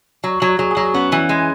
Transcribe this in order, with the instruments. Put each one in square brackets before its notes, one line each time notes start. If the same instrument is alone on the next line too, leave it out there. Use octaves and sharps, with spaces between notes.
[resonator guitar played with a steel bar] F#3
F#3
[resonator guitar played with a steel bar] F#3 [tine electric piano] G#4
[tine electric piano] G#4
[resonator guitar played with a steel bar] F#3
[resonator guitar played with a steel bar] B3 [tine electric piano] C#4
[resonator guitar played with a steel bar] E3
G#3